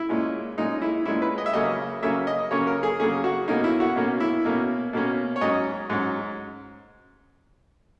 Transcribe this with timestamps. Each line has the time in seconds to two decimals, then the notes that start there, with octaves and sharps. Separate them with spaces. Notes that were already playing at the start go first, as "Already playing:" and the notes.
Already playing: E4
0.09 A#2 G#3 C#4
0.58 A#2 G#3 C#4 D#4
0.82 E4
1.05 A#2 G#3 C#4 E4
1.22 B4
1.38 D#5
1.46 E5
1.53 C#3 F#3 A#3 C#4 D#5
2.02 C#3 F#3 A#3 C#4 E5
2.27 D#5
2.51 C#3 F#3 A#3 C#4 C#5
2.67 A#4
2.83 G#4
2.99 C#3 F#3 A#3 C#4 G#4
3.24 F#4
3.48 B2 A#3 C#4 D#4
3.64 E4
3.80 F#4
3.96 B2 A#3 C#4
4.20 E4
4.45 B2 A#3 C#4
4.93 B2 A#3 C#4
5.36 C#5
5.41 G#2 F#3 C#4 D#5
5.90 G#2 F#3 C#4